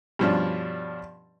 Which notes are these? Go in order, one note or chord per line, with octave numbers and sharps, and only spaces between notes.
G2 B2 F3 C#4 D4